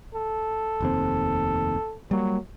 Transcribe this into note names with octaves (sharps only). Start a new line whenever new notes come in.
A4
F1 D#2 C4
F#3 G3 A#3